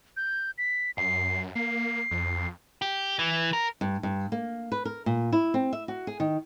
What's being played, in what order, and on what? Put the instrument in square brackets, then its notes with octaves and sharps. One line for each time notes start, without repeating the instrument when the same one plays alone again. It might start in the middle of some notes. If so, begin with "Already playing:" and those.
[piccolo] G6
B6
[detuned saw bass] F#2 [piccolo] C7
[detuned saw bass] A#3 [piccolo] C7
[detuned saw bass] F2
[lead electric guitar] G4
E3
A#4
[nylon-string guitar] G2
G2
A#3
B4
A#4
A#2
E4
C4
E5
F#4
G#4
D#3